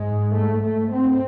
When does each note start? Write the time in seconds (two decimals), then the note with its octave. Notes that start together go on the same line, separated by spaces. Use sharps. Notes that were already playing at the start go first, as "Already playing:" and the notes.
Already playing: G#2 G#3
0.34 A3
0.62 A3
0.91 C4